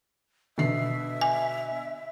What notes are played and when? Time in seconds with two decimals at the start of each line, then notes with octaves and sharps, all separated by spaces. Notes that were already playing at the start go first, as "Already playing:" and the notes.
0.58 B2 D3 E5 C7
1.21 G#5